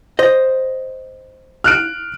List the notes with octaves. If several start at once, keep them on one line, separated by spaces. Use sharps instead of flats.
C5 D#5
F6 F#6 D7